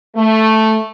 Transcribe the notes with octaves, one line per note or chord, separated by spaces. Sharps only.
A3